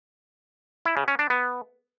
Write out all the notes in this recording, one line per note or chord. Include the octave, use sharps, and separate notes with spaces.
E4
C#3
C#4
D4
B3